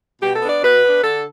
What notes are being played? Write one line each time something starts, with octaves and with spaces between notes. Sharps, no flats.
B2 G4
A4
B3 D4
D5
B2 B4
B3 D4
D3 A4